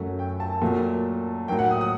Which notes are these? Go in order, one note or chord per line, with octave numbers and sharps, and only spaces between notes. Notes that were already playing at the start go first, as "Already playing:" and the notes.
Already playing: F#2 F#3 A3
G5
A5
A#2 F#3 A3
A2 F#3 A#3 G5
F#5
D#6
D#6